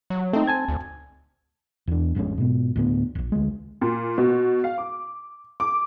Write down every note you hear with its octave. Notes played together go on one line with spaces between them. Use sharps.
F#3
A3 C4 D#4
G#5 A5 G#6
D2
E2 D4
A1 F2 G#3 C#4
G#2 B2
D2 A2 B3
D#1 A#1
D2 G#3
A#2
B2
F5
D6
D6